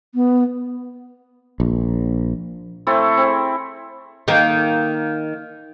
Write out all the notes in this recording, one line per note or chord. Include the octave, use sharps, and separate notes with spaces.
B3
A#1
A3 C4 E4 A4
C4 G#4
D#3 A#3